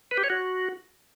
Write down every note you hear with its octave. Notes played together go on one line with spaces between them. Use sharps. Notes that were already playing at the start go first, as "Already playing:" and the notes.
B4
G4
C#5
F#4